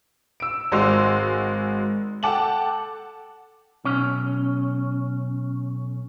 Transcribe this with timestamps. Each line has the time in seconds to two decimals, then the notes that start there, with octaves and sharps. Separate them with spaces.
0.40 E6 D7
0.72 G#1 G#3 F#4 C6 E6 F7
2.23 A4 F#5 G5 A5 D6 F#7
3.84 B1 C#4